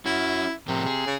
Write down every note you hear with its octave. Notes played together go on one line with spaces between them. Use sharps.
C#4 E4 F#4
A2 C3 F3 A#4
G#4
C#3